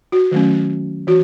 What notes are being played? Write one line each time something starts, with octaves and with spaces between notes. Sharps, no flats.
F#4
D#3 F#3 A3 C#4
E3 F#4